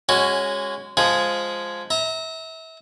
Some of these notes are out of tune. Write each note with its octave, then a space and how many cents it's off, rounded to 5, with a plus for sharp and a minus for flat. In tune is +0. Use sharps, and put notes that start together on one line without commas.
G#3 -15 C#4 +0 F#4 +0
F3 +0 G#3 +0 G#4 +0
E5 -30 A#5 +0